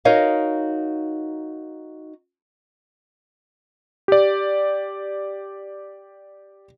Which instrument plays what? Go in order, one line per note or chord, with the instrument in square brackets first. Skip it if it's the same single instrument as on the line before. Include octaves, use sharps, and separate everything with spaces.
[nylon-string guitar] D#4 F#4 A#4 C#5 D#5 F5
[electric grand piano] G4 D5